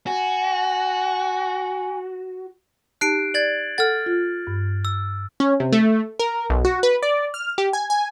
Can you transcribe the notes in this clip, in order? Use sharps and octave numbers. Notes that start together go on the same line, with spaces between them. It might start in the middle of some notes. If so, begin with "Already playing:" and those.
F#4 G#5
D#4 G4 A5 F#6 C7 D7
D5 G#6 A6 F#7
A4 F#5 F6 A6
F4
G2
E6
C#4
C3
A3
A#4
B1
F#4
B4
D5
F6
G4
G#5
G#5